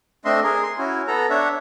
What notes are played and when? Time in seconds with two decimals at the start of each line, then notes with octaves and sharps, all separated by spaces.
0.25 A3 C4 D4 D#5 E5 C6
0.43 G#4 A#4
0.63 C6
0.78 C#4 E4 F#4
1.08 B3 A4 A#5
1.30 D4 C#5 E5 F#5